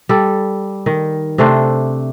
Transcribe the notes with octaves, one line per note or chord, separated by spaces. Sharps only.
G3 A4
D#3
C3 A3 D4 C5